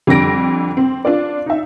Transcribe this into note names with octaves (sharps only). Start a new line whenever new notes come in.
F2 D3 G3 A#6 D7
C4
D4 F4 D5
D#4 E5